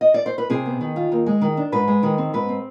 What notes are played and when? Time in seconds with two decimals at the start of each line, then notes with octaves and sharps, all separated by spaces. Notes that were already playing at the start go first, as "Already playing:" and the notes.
0.01 D#5
0.14 D5
0.26 C5
0.38 B4
0.50 C3 G#4
0.66 B3
0.81 D#3
0.96 F4
1.12 D#2
1.26 G#3
1.41 D#3
1.57 D4
1.72 G#2 B4
1.88 G#3
2.03 D#3
2.18 C4
2.33 G#2 B4
2.49 C4